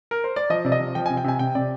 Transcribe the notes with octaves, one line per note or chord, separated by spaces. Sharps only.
A#4
C5
D5
F3 D#5
C3 D5
D#5
F3
F3 G5
C3 G#5
G5
C3 G#5
C3 G5
C3 D5